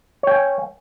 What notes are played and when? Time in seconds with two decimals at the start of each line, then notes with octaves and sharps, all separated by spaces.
0.23 C#5
0.27 G5
0.31 G#5